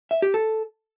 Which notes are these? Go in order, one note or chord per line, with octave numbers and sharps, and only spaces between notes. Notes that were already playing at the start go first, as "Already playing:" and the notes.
E5
G4
A4